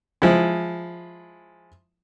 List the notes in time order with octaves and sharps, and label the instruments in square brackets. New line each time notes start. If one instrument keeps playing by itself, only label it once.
[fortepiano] F3 G#3 E4